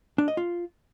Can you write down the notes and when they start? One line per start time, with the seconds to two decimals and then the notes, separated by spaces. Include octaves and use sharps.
0.18 D4
0.28 D#5
0.37 F4